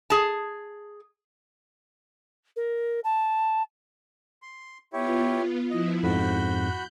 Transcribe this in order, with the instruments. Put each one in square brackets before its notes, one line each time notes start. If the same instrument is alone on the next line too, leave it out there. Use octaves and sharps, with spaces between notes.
[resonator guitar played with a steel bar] G#4 A5
[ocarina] A#4
A5
[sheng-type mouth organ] C6
[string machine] B3 F4 [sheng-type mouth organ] E4 G4 C#5
[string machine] F3 B3 E4 [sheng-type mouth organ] D#5
[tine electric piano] F2 G#2 [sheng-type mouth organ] F#4 B5 [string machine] F#6 G6